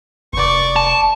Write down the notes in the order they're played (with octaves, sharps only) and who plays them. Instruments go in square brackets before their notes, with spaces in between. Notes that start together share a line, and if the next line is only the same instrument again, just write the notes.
[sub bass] F1 [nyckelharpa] D5 C#6
[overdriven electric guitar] A5